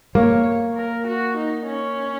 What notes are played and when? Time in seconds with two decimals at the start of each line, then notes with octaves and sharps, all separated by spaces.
0.15 A#3 C#5
0.76 A#4
1.07 F#4
1.37 D#4
1.66 C#4